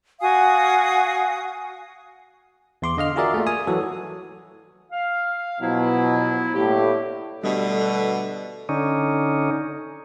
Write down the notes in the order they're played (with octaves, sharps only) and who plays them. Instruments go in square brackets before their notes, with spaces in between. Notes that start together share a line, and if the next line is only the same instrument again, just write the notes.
[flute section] F#4 F5 G#5 D#6
[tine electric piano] E2 C6 D6
D3 D#5 F5 F6
F4 F#4 G#4 A#4 D5 E5
A3 A#3
G#5 D#6
E3 F#3 F#4 A4
[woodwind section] F5
[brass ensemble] B2 [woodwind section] F3 F#3 E4
[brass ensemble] A2 [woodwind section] D3 A#3 G4
[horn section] B2 D3 A3 [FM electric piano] G3 D#5
[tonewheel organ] D3 C#4 D#4